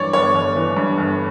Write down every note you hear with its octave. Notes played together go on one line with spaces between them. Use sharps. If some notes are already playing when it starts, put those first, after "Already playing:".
Already playing: G2 E3 C#5 D5
G1 C#5
G1
E3
G2
G1